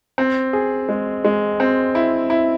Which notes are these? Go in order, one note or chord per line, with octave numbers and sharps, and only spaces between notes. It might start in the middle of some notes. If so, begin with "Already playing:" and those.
C4
G#4
G#3
G#3
C4
E4
E4